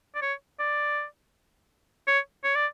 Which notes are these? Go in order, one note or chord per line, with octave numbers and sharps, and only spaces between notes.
D5
C#5
D5
C#5
C#5
D5